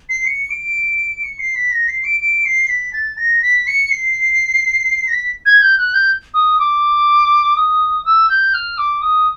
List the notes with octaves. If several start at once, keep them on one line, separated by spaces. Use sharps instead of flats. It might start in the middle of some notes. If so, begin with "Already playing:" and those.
C7
C#7
D7
C#7
C7
B6
A#6
C7
D7
D7
C7
B6
A6
A#6
B6
C#7
C7
A#6
B6
G#6
G6
F#6
G6
D#6
D6
D#6
E6
G6
F6
D6
D#6